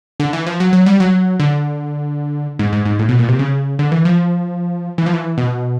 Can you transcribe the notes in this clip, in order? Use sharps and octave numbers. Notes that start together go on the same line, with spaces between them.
D3
E3
F3
F#3
F#3
G3
F#3
D3
G#2
G#2
G#2
A2
B2
A#2
C3
C#3
D3
E3
F3
E3
F3
E3
B2